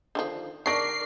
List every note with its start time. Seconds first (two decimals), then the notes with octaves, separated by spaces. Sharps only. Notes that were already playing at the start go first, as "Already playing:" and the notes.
0.15 D3 D#3 F3
0.66 D#3 D4 A#4 D5 C#6 A#6 C7 D7